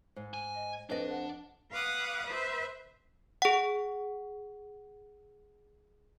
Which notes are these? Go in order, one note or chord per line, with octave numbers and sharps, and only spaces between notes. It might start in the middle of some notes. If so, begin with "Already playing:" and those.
G#2
G#5
D#5
F2 D4 B4 D#5
F#5
B4 F5 F#5 D6 D#6
B4 C5 E5
G#4 F#5